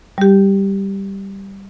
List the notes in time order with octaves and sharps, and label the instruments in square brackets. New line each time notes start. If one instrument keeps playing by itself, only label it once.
[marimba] G3 G4